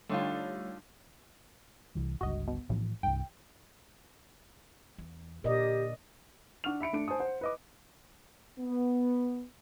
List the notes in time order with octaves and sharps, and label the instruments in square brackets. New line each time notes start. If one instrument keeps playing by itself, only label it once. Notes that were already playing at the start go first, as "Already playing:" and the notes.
[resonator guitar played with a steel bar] D3 D#4 F4 [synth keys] G3 A3 C#5
[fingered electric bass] C2 E3 G3
[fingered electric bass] G1 C#2 G2 [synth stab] F#4 D#5
[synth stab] B2
[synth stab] B1 [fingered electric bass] A2 E3 F3
[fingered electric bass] C2 G2 [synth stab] G5
[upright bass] E2
[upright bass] A#2 D3 [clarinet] G4 [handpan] A#4 D5 D#5
[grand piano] D4 F#5 C#6 F6 F7
E5 B5 C#7 D7
A3 D4 D7
C5 G#5 A5 D#6
C5 F#5
B4 D#5 D6
[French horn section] B3